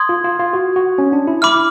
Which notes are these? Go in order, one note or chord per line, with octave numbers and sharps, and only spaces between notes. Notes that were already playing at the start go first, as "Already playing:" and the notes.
Already playing: C6 D#6 G#6
F4
F4
F4
F#4
F#4
C#4
D4
E4
E4 B5 D6 F6